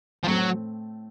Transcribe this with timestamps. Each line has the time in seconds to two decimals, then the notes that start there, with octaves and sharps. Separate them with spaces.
0.24 F3
0.28 A2 F#3 A3 C4